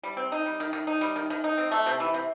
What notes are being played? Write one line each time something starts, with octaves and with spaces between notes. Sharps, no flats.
G3
C4
D#4
G3
D#3
D#3
D#4
G3
D#3
D#3
D#4
C4
A3
C3
E3
C3